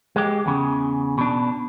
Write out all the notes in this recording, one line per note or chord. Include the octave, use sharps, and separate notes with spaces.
G#3 G4
E2 C#3
B2 D4